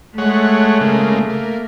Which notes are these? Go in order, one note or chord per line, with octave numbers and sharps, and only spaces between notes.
G#3 A3 C#5 F#5
C#3 G#3 A#3
A#3